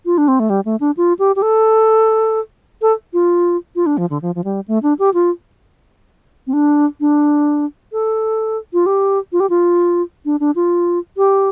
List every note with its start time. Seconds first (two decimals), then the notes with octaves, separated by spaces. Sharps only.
0.06 F4
0.18 D4
0.28 C4
0.40 A3
0.50 G3
0.65 A3
0.80 D4
0.97 F4
1.19 G4
1.36 G4
1.42 A4
2.82 A4
3.13 F4
3.76 F4
3.86 D4
3.98 F3
4.10 D3
4.22 F3
4.35 F3
4.44 G3
4.68 A3
4.83 D4
4.99 G4
5.14 F4
6.47 C4
6.53 D4
7.00 D4
7.93 A4
8.73 F4
8.86 G4
9.32 F4
9.40 G4
9.50 F4
10.25 D4
10.40 D4
10.56 F4
11.17 G4